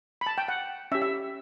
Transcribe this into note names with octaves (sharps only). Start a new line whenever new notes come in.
B5
A5
G5
F#5
C#4 G4 E5
E5